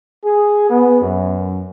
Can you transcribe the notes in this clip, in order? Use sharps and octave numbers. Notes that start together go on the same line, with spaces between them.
G#4
B3
F#2